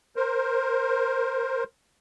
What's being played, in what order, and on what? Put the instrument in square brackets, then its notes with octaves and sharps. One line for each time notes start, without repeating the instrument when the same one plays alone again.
[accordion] A#4 C5